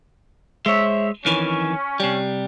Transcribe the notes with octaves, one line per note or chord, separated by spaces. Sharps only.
G#3 C5 C#5 E5
F2 D#3 E3 C#4
C3 G3